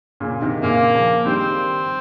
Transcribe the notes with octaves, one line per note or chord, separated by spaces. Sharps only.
A#2 C#3
C3 D#3
A#2 C#3 A#3
C#3 F3
D#3 G3 C4